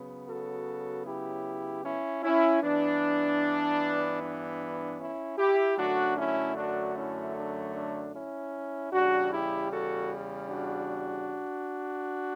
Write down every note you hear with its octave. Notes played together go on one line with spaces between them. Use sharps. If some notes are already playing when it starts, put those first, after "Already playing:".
Already playing: C#3 F#3 B3
F#4 A4
E4 G4
C#4 E4
C#4 E4
G2 E3 B3 D4
D4
C#4 E4
E4 G4
F#2 D3 F#3 A3 D4 F#4
C#4 E4
D4 F#4
C#4 E4
D4
D4
C#4 E4
E2 C#3 G3 D4 F#4
E4 G4
F#4 A4
D4 F#4